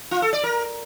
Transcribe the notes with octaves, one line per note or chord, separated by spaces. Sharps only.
F4
A4
D5
A#4